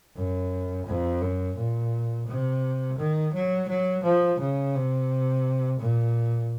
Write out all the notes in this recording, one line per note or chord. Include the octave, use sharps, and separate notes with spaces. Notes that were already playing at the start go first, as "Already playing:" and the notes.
F#2
F2
F#2
A#2
C3
D#3
F#3
F#3
F3
C#3
C3
A#2